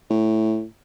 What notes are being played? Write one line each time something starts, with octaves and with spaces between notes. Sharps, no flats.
A2